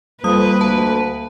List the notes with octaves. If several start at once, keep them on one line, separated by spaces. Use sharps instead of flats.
F2 G3 A#3 B4 D#6
D2 A5